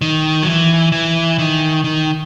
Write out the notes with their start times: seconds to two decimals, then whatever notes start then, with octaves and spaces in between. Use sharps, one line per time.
0.01 D#3
0.43 F#3
0.46 E3
0.92 E3
1.38 D#3
1.84 D#3